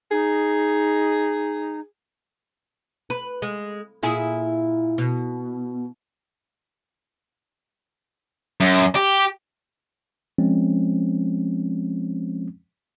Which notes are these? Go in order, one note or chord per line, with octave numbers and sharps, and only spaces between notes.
D#4 G#4
B4
G#3
A#2 E4 G#4
B2
F#2
G4
F3 G#3 C4 C#4